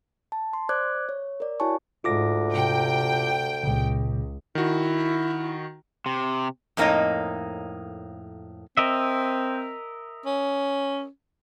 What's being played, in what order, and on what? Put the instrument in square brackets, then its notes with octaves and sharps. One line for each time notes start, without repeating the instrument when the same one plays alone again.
[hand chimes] A5
C6
C5 D5 D6 F#6 G#6
C#5
A#4 D5
E4 F#4 C#5 G#5 A5 C#6
[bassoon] D2 [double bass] G#2 [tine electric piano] F4 D6 A#6
[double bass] C3 [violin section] G5
[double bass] C#2 [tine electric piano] A#2 C#3
[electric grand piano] D#3 F#4 [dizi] E4
[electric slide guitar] C3
[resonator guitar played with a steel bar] F2 A2 A#3 D#4 C#5 D#5
[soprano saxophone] C4 [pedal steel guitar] A#4 D#5 E5
[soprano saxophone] C#4